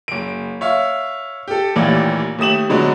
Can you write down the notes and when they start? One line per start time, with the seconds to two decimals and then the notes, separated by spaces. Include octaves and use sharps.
0.08 F#1 D7
0.61 C#5 E5 F5
1.48 G4 A4
1.76 A1 D#2 A#2 E3 D5 F5
2.39 D#2 A3 D#6 E7 F#7
2.69 B2 D3 F#3 G#3 B3 F#4